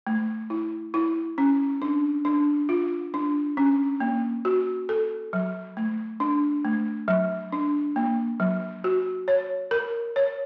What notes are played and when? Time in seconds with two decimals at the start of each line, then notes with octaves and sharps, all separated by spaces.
0.07 A3
0.50 E4
0.94 E4
1.38 C#4
1.82 D4
2.25 D4
2.69 F4
3.14 D4
3.57 C#4
4.00 A#3
4.45 F#4
4.89 A4
5.33 F#3
5.77 A3
6.20 D4
6.65 A3
7.08 F#3
7.52 D4
7.96 A#3
8.40 F#3
8.84 F#4
9.28 C#5
9.71 A#4
10.16 C#5